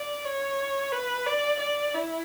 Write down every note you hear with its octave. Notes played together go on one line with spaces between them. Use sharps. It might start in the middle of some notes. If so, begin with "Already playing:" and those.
Already playing: D5
C#5
B4
D5
D5
E4